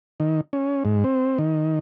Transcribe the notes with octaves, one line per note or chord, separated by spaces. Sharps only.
D#3
C#4
G#2
C4
D#3